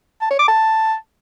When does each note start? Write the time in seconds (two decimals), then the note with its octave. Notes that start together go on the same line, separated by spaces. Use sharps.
0.22 A5
0.30 C#5
0.39 D6
0.48 A5